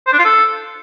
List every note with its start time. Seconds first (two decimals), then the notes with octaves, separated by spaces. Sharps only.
0.07 C5
0.13 D4
0.19 F4
0.25 A4